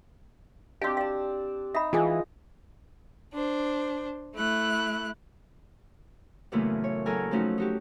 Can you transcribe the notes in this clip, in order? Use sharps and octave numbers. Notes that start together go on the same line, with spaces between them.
C4 D4 F#4 G4 D#5 F5
D5 F5 A5
D#4 E5 F#5 B5
E3 F4 G#4 D#5 G5 G#5 D#6
D4 C5
A3 E4 F#6
F#2 A#2 C#3 E3 A3 B3
C#5
E2 F#3 A4 A#4 G#5 F6
F3 F#3 A3 C#4 D#4 F#4
D#4 F#4 G4